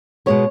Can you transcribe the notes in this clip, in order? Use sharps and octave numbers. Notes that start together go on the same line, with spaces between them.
B2 G#3 B3 C#5